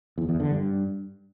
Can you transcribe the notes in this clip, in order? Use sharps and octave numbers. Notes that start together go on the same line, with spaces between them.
E2
E2
D3
G2